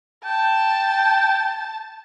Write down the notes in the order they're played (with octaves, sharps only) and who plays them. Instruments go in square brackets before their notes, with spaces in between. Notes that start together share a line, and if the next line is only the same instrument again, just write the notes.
[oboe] G5 [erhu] A5